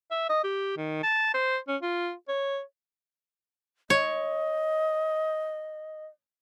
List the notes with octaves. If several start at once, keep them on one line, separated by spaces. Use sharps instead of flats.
E5
D#5
G4
D#3
A5
C5
C#4
F4
C#5
C#5 D#5